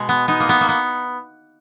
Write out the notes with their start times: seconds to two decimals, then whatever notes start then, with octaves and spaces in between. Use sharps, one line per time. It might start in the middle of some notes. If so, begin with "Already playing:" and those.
Already playing: B2 G#3
0.09 B3
0.28 B3 D#4
0.40 A#3
0.49 B3
0.61 A#3
0.69 B3